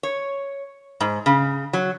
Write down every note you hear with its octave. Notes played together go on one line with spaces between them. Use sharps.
C#5
G#2
C#3
F#3